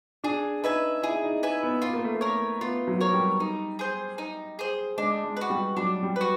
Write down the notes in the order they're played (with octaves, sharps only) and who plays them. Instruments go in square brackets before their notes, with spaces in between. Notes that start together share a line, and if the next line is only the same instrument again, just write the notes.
[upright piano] D4 [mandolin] G#4
[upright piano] D#4 [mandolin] B4 E5 G#5
[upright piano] E4 [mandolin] G#4
[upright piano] D#4
[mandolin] B4 E5 G#5
[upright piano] B3
[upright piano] B3 [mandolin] F4
[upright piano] A#3
A3
A#3
[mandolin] A#4 C#5
[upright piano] B3 [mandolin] F4
[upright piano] F#3
[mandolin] A#4 C#5
[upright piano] G3
[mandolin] D#4
G#4 C5
D#4
G#4 C5
[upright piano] G#3 [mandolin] D4
[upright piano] G#3
[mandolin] F#4 B4
[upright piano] G3
[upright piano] F#3 [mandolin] D4
[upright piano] G3
[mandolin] F#4 B4